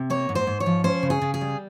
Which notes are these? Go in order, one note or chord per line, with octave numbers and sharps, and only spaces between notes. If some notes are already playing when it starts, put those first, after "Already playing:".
Already playing: C3
A#3 C#5
G#2
C5
G#2
C#5
F3
C#4 C5
C#3
G#4
C#3
G#4
G3